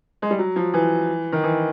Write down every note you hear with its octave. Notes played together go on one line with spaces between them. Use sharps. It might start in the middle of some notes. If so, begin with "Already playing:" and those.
G#3
G3
F#3
F3
E3
D#3
E3